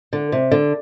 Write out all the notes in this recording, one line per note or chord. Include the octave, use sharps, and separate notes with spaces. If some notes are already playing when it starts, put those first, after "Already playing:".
D3
C3
D3